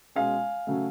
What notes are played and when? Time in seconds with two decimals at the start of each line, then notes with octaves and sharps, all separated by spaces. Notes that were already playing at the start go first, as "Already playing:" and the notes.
0.16 B2 G#3 C#4 F5 G#5
0.67 C#3 F#3 A3 C#4